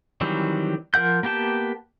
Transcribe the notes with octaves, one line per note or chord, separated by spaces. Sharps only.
D#3 E3 F#3 G3 C4
F3 A#4 F#5 G6
A#3 B3 G4 G5 A5